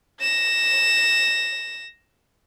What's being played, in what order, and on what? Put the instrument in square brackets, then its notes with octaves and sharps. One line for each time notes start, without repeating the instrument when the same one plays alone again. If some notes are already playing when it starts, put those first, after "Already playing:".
[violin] A#6 E7